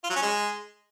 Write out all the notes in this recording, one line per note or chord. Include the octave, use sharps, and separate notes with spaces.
F4
F#3
C#4
G#3